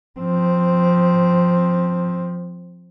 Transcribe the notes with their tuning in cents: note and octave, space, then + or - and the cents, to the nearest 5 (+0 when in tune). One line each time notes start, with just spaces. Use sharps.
F3 +15 C4 +0